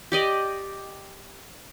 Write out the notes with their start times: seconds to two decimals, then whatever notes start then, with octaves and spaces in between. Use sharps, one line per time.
0.12 G4 D5 D#5